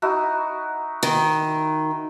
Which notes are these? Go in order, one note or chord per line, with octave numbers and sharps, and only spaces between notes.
D#4 E4 F#4
D#3